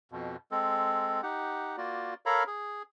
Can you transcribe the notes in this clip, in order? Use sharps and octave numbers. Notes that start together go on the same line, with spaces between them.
F2 B2
G#3 C4 A4
D#4 G4 F#5
A#3 F4 F#4 D5
A4 A#4 C#5 F5 A#5 B5
G#4